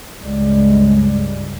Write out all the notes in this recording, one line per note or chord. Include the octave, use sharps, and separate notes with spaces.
C#2 G2 C#3 G3 G#3